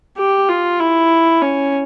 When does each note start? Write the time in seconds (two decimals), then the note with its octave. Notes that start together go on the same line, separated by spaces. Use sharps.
0.18 G4
0.49 F4
0.80 E4
1.42 C#4